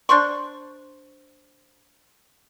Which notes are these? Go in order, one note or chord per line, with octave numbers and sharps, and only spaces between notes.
D4 C5 C6 C#6